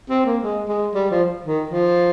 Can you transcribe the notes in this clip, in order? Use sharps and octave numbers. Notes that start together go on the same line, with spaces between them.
C4
A#3
G#3
G#3
G3
F3
D#3
F3